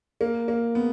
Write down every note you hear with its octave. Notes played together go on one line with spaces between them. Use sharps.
A#3
A#3
B3